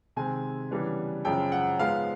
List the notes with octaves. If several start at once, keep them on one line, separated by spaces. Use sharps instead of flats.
C3 D#3 G#3 C4 G#5
C#3 E3 G3 B3 D4
F#2 C#3 F3 G#3 G5
F#5
G#2 F3 G#3 B3 F5